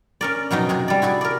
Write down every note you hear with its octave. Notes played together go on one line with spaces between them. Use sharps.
C#4 A#4 D5
F2 B2 F#3 D#4
C3 F#4 G#4
G3 D5
E4 F#4 G#4 A4
A#4 D5